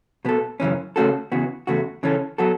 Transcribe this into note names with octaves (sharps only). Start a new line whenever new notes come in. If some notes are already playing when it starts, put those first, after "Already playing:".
B2 B3 A4
F#2 C#3 E3 C#4
C#3 A3 C#4 F#4 A4
E2 C#3 E3 B3 F#4
E2 C#3 A3 F#4
C#3 E3 C#4 A4
F#3 B3 F#4 A4